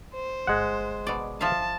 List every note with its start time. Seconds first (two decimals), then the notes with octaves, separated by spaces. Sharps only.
0.15 C5
0.47 G1 G#3 F#5
1.07 B2 D5
1.41 F3 E5 F5 A5